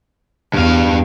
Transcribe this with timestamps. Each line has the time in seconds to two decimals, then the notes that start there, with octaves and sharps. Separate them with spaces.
0.54 E2 G2 F5